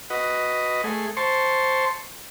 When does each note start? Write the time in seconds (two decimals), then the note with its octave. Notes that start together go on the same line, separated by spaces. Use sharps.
0.10 F#4 B4 D#5
0.84 A3 G#4
1.17 C5 A5 C6 C#6